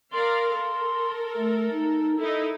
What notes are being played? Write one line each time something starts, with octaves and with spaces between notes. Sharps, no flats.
A#4 D5 F5 C6
A4 A#4
A3
D#4
D#4 E4 A4